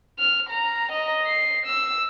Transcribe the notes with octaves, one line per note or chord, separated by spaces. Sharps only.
F6
A#5
D#5
C7
E6